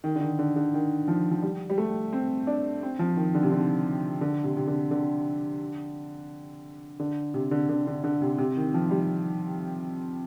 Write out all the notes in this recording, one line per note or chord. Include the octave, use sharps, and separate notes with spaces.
D#3
D3
D#3
D3
D3
D#3
F3
F3
G3
G3
A3
C4
D4
C4
F3
D#3
D3
C3
D3
D3
C3
C3
D3
D3
D3
C3
D3
D3
D3
D3
C3
C3
D#3
F3
G3